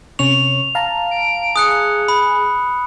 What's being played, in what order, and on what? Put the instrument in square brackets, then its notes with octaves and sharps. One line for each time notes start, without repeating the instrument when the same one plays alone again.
[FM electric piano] C3 C#4 C#6 [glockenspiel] F7
[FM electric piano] F5 A5 A#5
[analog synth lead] D7
[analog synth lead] G#4 [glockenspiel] D#6 F#6 C#7
[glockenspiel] B5